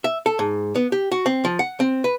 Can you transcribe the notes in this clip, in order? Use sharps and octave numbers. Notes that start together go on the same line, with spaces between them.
E5
A4
G#2
B3
G4
F#4
C4
F3
F#5
C4
B4